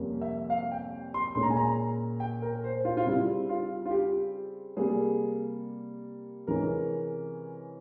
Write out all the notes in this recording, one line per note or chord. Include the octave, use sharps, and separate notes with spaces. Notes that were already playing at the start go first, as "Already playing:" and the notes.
Already playing: F2 C3 G3 A#3 C#4
E5
F5
G5
C6
A#2 G#3 C#4 C6
A#5
G#5
A#5
G5
A#4
C5
F4
F4
C#3 G3 C4 E4
F4
F4
G4
C3 G3 A#3 G#4
C3 E3 G#3 C#4 A#4